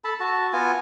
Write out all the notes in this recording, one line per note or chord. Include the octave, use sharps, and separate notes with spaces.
A4 A5 B5
F#4 A5
B3 F4 G#5